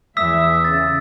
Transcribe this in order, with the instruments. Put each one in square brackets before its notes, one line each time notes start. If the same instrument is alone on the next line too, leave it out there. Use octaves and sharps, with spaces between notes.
[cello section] E2 E5 [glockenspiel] D#6 E6 B6
[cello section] C#3 [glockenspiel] A6